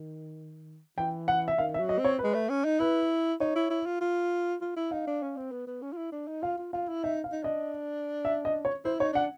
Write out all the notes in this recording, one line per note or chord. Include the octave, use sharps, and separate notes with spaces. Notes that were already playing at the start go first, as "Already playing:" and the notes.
Already playing: D#3
E3 G5
F#5
E5
D#3 F5
E5
F#3
D#5
C4
C#5
B4
G#3
A3
C#4
D#4
E4 B4
D#4 C#5
E4
E4
F4
F4
F4
E4
D#4 F5
D4
C#4
C4
B3
B3
C#4
F4
E4
D4
D#4
F4 F5
F4
F4 F5
E4
D#4 E5
F5
D#4
D4 D#5
E5
D#5
C#5
E4 C5
D#4 C#5
D4 F#5